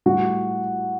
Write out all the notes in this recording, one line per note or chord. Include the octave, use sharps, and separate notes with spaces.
A2 G3 F#4